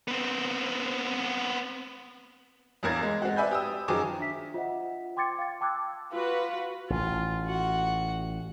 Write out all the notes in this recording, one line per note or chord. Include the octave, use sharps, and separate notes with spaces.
B3 C4
G1 E2 A#4 G#6 A6
G#3
G#3 C4 F#4
B4 D5 E5 G#5 B5 G6
G4 D#6 E6
F#2 D#3 F3 G#4 G#5 D6
D4 E5 B6
F4 C5 D#5 E5 F#5
G5 C6 D6 G#6 A6 C#7
F5 A6
G5 A5 D6 E6 F#6 G#6
F4 F#4 B4
A1 F4
F#4 F#5